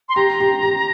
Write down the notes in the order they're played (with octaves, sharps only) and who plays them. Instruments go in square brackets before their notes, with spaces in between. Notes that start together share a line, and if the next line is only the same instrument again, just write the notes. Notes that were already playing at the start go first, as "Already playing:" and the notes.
[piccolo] C6
[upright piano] G4 [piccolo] A#5
[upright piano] G4
G4